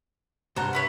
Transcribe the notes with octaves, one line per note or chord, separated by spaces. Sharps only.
C2 G2 C5 F#5 A#5
E4 B4 C#5